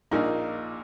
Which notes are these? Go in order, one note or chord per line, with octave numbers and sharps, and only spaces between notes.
A#1 A#2 A#3 D#4